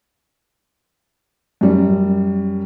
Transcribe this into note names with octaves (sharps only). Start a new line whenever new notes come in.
F#2 G3